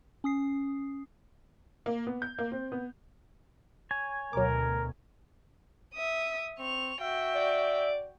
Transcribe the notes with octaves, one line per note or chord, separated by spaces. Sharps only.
C#4 D#6 C7
A#3
B3
G6
A#3
C4
B3
C#5 G#5
D2 B2 F#3 A#4 D6
E5 D#6
C4 C#6 F7
F#4 E5 G5
D5